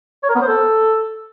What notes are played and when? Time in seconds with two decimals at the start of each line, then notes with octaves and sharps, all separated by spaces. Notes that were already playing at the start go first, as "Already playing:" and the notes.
0.23 C#5
0.29 A#4
0.35 B3
0.42 C5
0.48 A4